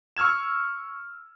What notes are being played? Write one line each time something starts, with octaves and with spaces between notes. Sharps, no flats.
C#6 E6 F6 G#6 E7